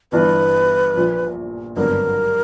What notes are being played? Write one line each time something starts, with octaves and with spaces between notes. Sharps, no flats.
G1 G2 E3 B4
A#1 A#2 F3
G#1 G2 D3 F#3 B3 A#4